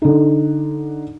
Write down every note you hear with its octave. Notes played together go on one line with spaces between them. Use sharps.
D3 D#4